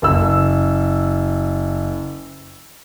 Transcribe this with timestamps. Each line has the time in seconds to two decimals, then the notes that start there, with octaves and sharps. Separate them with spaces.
0.02 F#1 E6